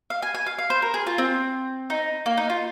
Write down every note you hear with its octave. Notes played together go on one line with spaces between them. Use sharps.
F5
G#5
G#5
F5
F5
C5
A#4
G#4
F4
C4
D#4
A#3
D#4
F4